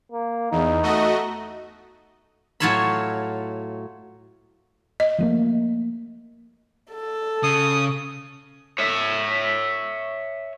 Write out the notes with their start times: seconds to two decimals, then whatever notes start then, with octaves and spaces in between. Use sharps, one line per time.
0.12 A#3
0.52 E2 D#4
0.83 A3 F#4 D#5
2.60 A2 F#3 F4 C#5 E5 B5
5.00 D#5
5.19 F3 A3 A#3
6.91 A4
7.43 C#3 D#6
8.78 C#5 E5